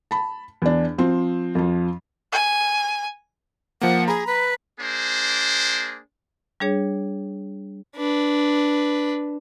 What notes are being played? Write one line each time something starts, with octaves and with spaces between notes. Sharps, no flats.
A5 B5
E2 D4
F3 C4
F2 F3
G#5
F3 A#3 F#5
G#4 A#5 B5
B4
A#3 D4 G#4 C5
G3 D4 G#4 C#5
D4 B4